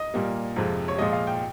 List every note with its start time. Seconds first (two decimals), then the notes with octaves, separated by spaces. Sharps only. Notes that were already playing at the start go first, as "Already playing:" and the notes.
Already playing: D#5
0.14 A#2 G3 A#3
0.56 F2 C3 F3 G#3
0.88 C#5
0.98 A#2 F3 G#3 D#5
1.13 F5
1.27 G5